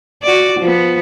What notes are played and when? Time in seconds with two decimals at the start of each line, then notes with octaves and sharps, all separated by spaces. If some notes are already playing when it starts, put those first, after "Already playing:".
0.23 F#4 D5
0.60 F3 B3